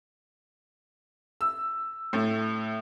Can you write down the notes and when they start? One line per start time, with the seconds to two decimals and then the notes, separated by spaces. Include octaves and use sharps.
1.41 E6
2.13 A2